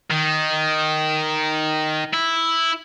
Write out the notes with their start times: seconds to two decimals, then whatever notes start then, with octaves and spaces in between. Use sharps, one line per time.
0.10 D#3
2.13 E4